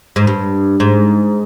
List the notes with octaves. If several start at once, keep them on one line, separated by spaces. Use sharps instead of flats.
G#2
G2
G#2